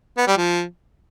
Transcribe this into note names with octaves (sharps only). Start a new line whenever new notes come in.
B3
G3
F3